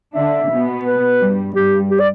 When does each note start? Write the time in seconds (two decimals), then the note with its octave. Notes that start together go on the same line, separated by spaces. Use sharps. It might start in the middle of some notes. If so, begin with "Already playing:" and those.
0.15 D3 D4 E5
0.50 B2 B3
0.85 B4
1.20 G2 G3
1.55 G2 G3 G4
1.90 G4
2.00 D5